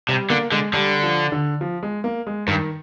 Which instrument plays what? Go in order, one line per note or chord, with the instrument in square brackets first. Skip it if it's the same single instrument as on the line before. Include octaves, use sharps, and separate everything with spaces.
[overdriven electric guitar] C3 [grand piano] G3
[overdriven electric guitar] D3 [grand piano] A#3
[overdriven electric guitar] D3 [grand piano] G#3
[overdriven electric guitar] D3 [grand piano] G3
[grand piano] F3
D3
F3
G#3
A#3
G#3
[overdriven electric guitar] G2 [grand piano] D#3